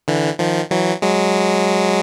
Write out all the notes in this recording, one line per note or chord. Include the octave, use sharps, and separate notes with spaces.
D3 E3
D#3 F3
E3 F#3
F#3 G#3